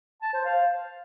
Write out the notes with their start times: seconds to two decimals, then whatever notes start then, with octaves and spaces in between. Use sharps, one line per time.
0.22 A5
0.33 C5
0.45 F5